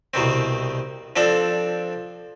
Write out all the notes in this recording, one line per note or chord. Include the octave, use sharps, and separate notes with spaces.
C2 B2 D#3 C4
F3 C4 D4 A4 D5